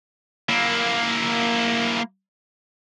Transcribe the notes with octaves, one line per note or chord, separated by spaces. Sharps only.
A#3 E4